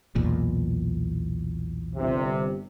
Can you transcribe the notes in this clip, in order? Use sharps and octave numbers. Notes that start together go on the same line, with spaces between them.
B1 E2 A#2
G1 C3